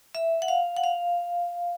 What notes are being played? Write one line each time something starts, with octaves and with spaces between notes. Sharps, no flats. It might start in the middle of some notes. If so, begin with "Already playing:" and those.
E5
F#5
F5
F#5
F5